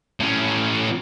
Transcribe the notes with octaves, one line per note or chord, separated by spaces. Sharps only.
A2 C#4